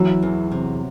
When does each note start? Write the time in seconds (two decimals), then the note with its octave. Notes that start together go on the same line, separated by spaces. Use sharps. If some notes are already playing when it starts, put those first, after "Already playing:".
Already playing: E3 F#3
0.23 E2
0.52 C3